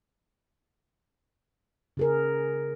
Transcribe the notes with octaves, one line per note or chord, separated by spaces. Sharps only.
C#3 G#4 A#4